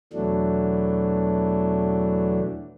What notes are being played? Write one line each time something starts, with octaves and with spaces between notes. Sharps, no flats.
E2 B2 E3 F#3 A3 D4